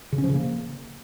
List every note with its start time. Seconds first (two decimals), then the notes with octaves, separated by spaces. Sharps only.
0.12 C#3
0.18 C#4
0.24 F3
0.30 C#3
0.35 A#3